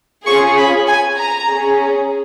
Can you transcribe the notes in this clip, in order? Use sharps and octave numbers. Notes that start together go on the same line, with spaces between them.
C#4 F4 G#4 C#6
B5
G#5
A#5
C#4 G#4